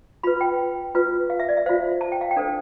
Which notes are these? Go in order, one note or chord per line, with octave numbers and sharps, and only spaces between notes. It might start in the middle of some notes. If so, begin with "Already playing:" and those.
F4 B4 B5
G5
F4 B4
F5
E5
D5
E5
F4 C5 F5
A5
G5
F5
G5
D4 A4 C5